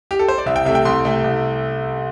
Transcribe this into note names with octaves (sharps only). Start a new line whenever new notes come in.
G4
A4
C5
D5
C2 E5
G5
C3 A3 E5
G5
C2 C6
C3 A3
C2